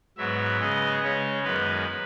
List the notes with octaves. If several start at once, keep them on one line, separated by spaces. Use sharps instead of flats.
G#2 F#3 B3 E5
C#3 G#3 B3 D#5
C#3 G#3 C#4 C#5
F#2 D#3 G#3 B3 B4